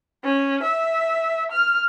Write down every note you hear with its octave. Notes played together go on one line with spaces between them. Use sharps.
C#4
E5
F6